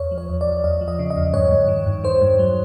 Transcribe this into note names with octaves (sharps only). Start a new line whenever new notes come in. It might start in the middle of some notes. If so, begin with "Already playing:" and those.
Already playing: E2 C#5
F3
C#5
E2
D5
E2
E2 D#5
F3
D#5
C#3
D#5
E2
G2 C#5
G2
D#3
G2
D#3 C5
G2
F#3